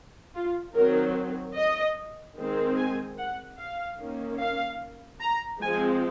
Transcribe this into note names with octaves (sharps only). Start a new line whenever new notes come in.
F4
D#3 F#3 C4 A#4
D#5
D#3 G#3 C4
G#5
F#5
F5
D#3 A#3 C#4
F5
A#5
F3 G#3 C4 G#5